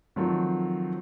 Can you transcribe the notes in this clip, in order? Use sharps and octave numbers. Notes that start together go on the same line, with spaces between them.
D#3 F3 F#3 C4 A4